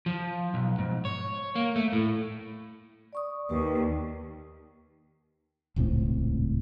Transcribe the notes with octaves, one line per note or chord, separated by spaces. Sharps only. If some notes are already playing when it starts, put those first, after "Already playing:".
F3
B1
G#2
C#5
A#3
A3
A2
D5 C#6 D#6
D#2 G4 B4
D#1 C#2 A2 C4